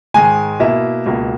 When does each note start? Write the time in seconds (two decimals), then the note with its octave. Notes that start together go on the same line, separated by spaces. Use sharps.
0.14 G#2 D#3 G#3 G#5
0.60 B2 A#3 E4 E5
1.06 C#2 B2 A#3